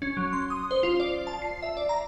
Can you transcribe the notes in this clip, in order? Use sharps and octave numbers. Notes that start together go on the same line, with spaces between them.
C#4
F#3
C6
D#6
C5
F4
D5
A5
C7
E5
D5
A#5